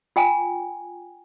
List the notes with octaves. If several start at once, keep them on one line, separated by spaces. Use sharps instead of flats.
F4 G5 G#5